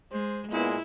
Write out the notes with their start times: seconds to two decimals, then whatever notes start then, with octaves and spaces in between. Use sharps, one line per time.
0.12 G#3 C5
0.52 A#2 G#3 B3 E4